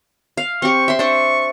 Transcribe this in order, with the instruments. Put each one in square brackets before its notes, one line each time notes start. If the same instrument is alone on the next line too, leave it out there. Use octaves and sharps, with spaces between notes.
[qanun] F5
[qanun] C4 G4 [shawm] C#6
[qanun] E5 C6
[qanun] D4 C5 [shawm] C#6